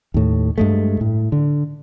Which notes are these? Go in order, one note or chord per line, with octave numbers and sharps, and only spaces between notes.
D#2 A2
G2 G#3 A3
A2
D3